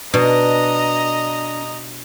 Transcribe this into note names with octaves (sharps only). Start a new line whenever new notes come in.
B2 D4 D#5 A#5